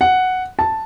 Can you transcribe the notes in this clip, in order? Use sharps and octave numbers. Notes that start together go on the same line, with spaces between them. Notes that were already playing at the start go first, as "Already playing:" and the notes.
F#5
A5